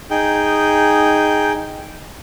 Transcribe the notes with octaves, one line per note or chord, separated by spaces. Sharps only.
D#4 G#4 G5